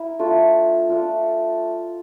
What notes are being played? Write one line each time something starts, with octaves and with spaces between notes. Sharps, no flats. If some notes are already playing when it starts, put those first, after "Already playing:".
Already playing: E4 A#4 E5
A3 D4 F4
A3 D4 F4